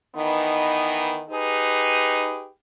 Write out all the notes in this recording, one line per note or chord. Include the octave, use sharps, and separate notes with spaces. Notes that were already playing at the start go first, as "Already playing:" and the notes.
D#3 E3 B3 D#4
D#4 G4 G#4 B4